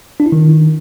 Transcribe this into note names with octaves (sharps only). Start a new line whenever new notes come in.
D4
E4
D#3